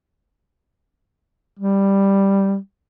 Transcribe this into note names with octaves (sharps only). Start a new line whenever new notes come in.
G3